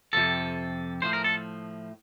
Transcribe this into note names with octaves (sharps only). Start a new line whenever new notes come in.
F2 C3 F3 A4
A2 F3 C5
A#4
A4